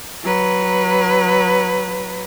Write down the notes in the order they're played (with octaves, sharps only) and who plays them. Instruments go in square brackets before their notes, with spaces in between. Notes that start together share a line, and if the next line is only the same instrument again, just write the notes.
[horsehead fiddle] F#3 B4